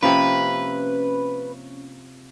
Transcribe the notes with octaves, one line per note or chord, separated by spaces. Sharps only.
C3 F3 A#3 C#4 B4